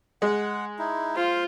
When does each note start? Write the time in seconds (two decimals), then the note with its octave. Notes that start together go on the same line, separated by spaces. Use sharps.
0.22 G#3 F#5
0.79 D#4 E4
1.16 F4 C5 F5